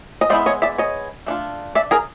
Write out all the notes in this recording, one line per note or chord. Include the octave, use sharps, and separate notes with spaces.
D#5
G#3 B3 E4 C5 D5
C#5 D#5
D5 E5
C#5 D#5
A3 D4 F4
D5 E5
G#4 A#4